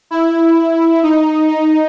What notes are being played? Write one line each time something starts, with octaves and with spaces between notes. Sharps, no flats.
E4
D#4
D#4